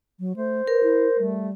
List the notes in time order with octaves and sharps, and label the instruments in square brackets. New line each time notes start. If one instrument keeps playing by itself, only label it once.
[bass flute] F#3
[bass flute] A3 [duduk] C5
[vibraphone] A#4 [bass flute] B4
[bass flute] E4
[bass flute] G3 [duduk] A3